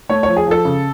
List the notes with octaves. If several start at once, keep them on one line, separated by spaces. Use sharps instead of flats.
A3 C#5
F3 C#5
G#4
F3 A4
C#3